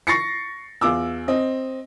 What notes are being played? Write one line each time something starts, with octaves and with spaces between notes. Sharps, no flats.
C#6 A6 A#6 C7 C#7
E2 F4 D6 E6
C4 D#5